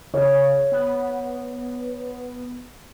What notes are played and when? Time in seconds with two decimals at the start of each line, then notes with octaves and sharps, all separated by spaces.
0.14 C#3 C#5
0.72 B3